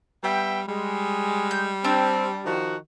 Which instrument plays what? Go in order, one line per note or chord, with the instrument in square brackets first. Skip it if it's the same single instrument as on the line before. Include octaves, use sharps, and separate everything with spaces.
[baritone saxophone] G3 [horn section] B3 E5 G5
[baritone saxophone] G3 [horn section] G#3
[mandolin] G6
[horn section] C4 [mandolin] D4 G4 E6
[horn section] D#3 F3 F#4